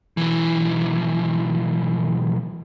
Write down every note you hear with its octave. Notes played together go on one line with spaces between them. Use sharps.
B1 E3